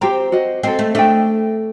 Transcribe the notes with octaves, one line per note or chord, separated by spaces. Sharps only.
C4 G4 C5 G5 A#5
F#4 C5 D#5
C4 A4 C5 D#5
A3
A3 D4 A4 D#5 G5